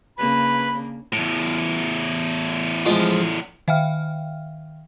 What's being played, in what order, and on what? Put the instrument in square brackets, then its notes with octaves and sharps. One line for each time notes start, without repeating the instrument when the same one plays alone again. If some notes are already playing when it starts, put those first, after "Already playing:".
[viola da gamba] C#3 A#3 D4 [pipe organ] B4 [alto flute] B5
[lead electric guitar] E2 A2
[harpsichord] F3 G#3 F4
[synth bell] D#3 E5 F5 G5 F6